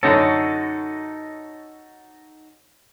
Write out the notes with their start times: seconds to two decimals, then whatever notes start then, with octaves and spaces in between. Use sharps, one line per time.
0.03 F#2 D3 C#4 D#4 F#4 A4